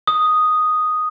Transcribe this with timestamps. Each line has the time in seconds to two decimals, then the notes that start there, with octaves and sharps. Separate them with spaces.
0.07 D#6